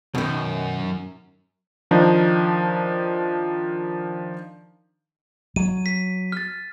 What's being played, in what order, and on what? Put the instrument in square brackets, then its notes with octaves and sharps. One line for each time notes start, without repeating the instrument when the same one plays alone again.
[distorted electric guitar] F#2 [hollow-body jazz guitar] B2 D#3
[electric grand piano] D#3 F3 D4 D#4
[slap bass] F#3 [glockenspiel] D#7
[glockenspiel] B6
F6 A6